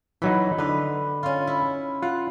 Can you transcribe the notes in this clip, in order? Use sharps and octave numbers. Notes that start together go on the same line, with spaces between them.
E3 F#3 D#4 B5
D3 D#4 B4
C#4 F4
E4
F4 F#5